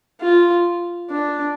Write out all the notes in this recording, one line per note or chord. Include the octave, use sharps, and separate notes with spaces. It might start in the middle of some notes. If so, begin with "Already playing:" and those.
F4
D4